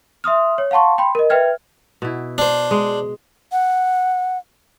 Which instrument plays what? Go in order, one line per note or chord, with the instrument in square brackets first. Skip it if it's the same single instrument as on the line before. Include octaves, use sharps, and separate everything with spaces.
[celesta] E5 C6 D#6 F6
C#5
F5 F#5 A5 C6 C#6
G5 B5 C6
A#4 D#5
B4 E5 G5 F6 G#6
[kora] B2 E4
[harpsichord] D4 C5
[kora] G#3
[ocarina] F#5